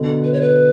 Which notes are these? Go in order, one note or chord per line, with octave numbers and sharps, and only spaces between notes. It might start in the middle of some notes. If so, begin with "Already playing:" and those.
Already playing: B2 D3
B4
C#5
B4